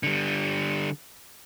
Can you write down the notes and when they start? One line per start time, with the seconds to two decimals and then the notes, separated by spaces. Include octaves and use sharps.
0.03 D3 G3